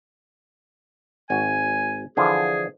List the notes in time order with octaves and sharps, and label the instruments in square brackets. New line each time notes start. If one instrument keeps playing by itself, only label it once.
[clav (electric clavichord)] G#1 F#4 [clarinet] G#5
[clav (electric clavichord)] D3 E3 F3 [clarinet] G#4